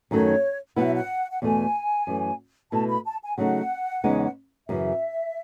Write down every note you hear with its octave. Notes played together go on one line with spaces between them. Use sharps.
F#2 D#3 F#3 A3 D#4 C#5
B2 F#3 B3 E4 F#5
E5
F#5
F#5
E2 B2 A3 G#5
F#2 E3 A3
B2 A3 E4 A5
B5
A5
G#5
C#3 F#3 A3 D#4 F#5
E2 C#3 G#3 B3 D#4
F#2 C#3 E3 E5